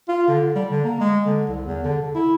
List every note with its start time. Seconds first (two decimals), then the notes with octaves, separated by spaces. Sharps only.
0.09 F4
0.28 D3
0.56 G3
0.70 D3
0.84 A#3
1.00 G#3
1.26 D3
1.48 C2
1.65 E2
1.84 D3
2.03 D3
2.15 E4